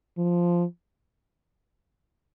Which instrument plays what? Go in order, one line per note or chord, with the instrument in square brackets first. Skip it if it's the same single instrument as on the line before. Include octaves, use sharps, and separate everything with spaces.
[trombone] F3